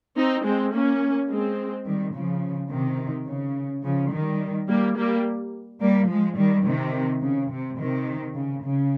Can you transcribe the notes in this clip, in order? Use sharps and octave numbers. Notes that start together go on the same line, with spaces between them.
C4 D#4
G#3 C4
A#3 C#4
G#3 C4
D#3 G3
C#3 F3
C3 D#3
C#3
C#3 F3
D#3 G3
G3 A#3
G3 A#3
G3 A#3
F3 G#3
D#3 G3
C3 D#3
C#3
C3
C3 D#3
C#3
C#3